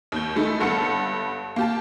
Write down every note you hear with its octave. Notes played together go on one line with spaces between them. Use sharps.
D#2 G6
G#3 A3 D#4 E4
G1 G2 A4 F#5 A5 C#7
A#3 G4 A5